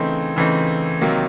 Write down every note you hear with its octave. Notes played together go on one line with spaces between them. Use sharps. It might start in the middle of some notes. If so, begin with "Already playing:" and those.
Already playing: C#3 E3 A3 C4 D#4
C#3 E3 A3 C4 D#4
C3 D#3 F#3 A#3 D#4